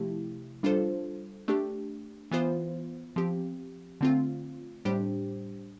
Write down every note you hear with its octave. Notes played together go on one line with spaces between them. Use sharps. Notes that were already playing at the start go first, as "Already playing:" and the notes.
Already playing: C3 F3 A3 E4 G4
G3 D4 F4 A4 C5
A3 D4 G4
E3 B3 F4 C5
F3 C4 G4
D3 A3 C4 F4
A2 G3 D4 G4 C5